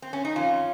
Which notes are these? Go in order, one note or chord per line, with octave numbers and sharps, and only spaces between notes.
C4
C#4
D#4
F2 C#4 F4